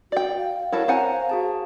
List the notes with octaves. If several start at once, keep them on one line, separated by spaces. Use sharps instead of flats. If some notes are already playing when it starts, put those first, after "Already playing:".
F#4 D5 G5
F5
E4 F#4 A4 A#4 C#5
C4 C5 F#5 G#5 A#5
F#4 G#4 A5